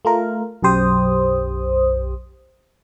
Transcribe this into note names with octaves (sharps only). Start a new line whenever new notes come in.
A3 F4 A#4
B1 F#2 G4 C5 D#6